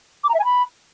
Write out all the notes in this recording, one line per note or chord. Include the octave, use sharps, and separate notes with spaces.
D6
A#5
E5
G#5
B5